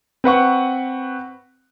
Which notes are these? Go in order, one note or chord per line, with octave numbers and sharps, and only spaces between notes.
C4 B4 F#5 C#6